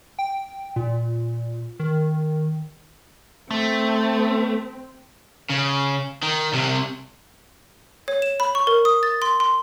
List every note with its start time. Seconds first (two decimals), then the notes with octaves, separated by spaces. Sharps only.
0.19 G5
0.76 A#2
1.80 D#3
3.51 A3 C4
5.50 C#3
6.22 D#3
6.53 C2 C3
8.08 C#5
8.22 E7
8.40 B5
8.55 C#6
8.67 A#4
8.85 D#6
9.03 A6
9.22 C6
9.40 C6